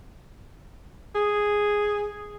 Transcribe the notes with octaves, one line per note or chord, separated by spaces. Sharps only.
G#4